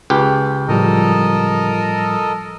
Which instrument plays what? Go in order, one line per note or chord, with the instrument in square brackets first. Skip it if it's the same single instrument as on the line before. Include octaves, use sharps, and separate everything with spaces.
[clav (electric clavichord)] C#2 G4 [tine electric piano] B4
[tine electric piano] A2 F3 G3 [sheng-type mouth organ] A4 A#4 D#5